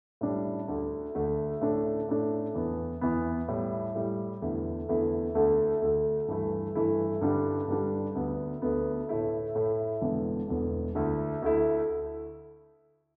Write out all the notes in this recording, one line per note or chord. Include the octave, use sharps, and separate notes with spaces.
A2 G3 D4
D2 D3 A3
D2 D3 A3
A2 A3 D4
A2 A3 D4
E2 E3 B3
E2 E3 B3
A2 G3 E4
A2 G3 E4
E2 D3 A3 E4
E2 D3 A3 E4
D2 D3 A3
D2 D3 A3
G2 E3 A3 E4
G2 E3 A3 E4
G2 D3 G3 D4
G2 D3 G3 D4
D2 D3 B3
D2 D3 B3
A2 A3 E4
A2 A3 E4
E1 E2 D3
E1 E2 D3
D2 D3 A3 E4
D2 D3 A3 E4